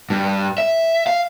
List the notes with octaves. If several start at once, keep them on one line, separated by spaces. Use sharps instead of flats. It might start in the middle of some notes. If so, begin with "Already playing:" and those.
G2
E5
F5